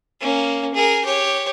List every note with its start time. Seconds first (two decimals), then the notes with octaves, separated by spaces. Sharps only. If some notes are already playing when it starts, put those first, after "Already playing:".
0.21 A#3 C#4
0.74 G#4 A#4
1.05 G4 C#5